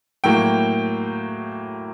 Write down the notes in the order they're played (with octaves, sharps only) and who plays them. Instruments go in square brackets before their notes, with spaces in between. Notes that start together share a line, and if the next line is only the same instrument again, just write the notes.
[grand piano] A2 F#3 A#3 G5